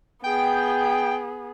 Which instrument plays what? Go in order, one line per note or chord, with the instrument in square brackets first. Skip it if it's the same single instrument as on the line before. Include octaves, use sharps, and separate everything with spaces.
[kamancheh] B3 G#4 [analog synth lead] G5